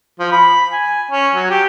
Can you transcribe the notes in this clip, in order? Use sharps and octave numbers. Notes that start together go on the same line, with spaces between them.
F3
B5
G#5
C#4
F#3
G4